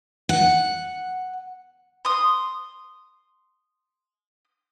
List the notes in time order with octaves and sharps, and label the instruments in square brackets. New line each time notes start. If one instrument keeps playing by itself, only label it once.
[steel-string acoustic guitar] F#5
[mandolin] C6 D#6